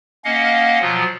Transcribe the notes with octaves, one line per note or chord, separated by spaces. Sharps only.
A#3 C#4 D#5 F5 F#5
B2 F3 F#3 F4